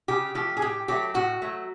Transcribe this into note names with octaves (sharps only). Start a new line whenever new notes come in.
C#3 G4
F3 A3 G4
G#4
A2 G4
F#3 A3 G4
A2 F#4
F#3 A3